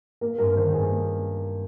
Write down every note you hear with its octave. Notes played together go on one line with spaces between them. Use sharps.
A#3 A#4
G2 A#4
D#3 C5
G2 G#4
A#3